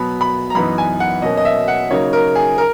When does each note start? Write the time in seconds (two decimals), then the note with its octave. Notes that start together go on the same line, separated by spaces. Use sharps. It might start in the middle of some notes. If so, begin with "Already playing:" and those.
Already playing: B2 F#3 B3 B5
0.21 B5
0.50 A#5
0.55 F#2 E3 B3 D#4 B5
0.78 G#5
1.00 F#5
1.22 B2 F#3 A#3 C#4 D#5
1.37 D#5
1.45 E5
1.68 F#5
1.91 C#3 F#3 A#3 D#4 C#5
2.13 A#4
2.35 G#4
2.58 A#4